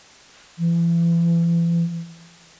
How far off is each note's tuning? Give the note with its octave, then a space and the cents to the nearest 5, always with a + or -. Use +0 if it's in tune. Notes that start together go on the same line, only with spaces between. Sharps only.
E3 +40